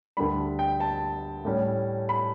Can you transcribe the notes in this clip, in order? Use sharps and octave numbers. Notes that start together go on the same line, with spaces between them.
D2 D3 G3 D4 B5
G5
A5
A2 G3 C#4
B5